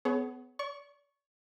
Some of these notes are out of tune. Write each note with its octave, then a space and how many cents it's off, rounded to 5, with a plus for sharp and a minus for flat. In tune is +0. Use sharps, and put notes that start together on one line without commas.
B3 +25 G#4 +40 C#5 +0
D5 -40 C#6 +0